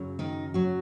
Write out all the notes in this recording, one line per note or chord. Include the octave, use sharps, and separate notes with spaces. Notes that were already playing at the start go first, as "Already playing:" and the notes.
Already playing: F#2 C#3 F#3
D#3 D#4
F#3 F#4